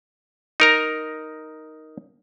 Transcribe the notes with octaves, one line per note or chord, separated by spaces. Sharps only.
D#4 A#4 A#5